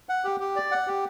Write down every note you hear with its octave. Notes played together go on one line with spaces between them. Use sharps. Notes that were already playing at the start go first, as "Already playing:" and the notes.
F#5
G4
G4
D5
F#5
G4